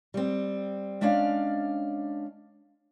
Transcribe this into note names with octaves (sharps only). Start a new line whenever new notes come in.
G3 C4
G#3 C#4 D4 D5 F5